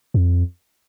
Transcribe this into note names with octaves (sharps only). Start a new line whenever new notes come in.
F2